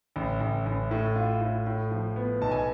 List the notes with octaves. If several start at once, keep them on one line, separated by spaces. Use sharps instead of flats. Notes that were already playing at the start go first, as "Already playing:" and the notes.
A1
A1
A1
A2
F4
A2
A2
F3
B3
B1 A5
G#5